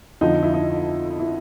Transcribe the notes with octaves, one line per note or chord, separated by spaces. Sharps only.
F2 D3 F3 D#4
E4
D#4
E4